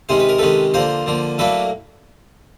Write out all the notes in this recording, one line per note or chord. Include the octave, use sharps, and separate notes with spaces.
C3 D#3 G#3 C#4 C5
B4
A#4
C3 D#3 G#3 C#4 A4 B4
D3 F3 A#3 A#4 C5
D3 F3 A#3
A2 F#3 A#3 D4 A4 B4